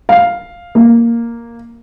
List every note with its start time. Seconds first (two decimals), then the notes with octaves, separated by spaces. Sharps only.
0.09 F5
0.75 A#3